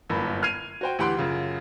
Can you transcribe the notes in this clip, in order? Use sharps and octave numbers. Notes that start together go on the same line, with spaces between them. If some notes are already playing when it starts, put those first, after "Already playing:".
G1 F#2 A2 A#3 B5
F6 G#6 C7 D#7 F7
F#4 C5 G5
D2 E3 G4 F#5 C6 D7
F#2 C#3 F4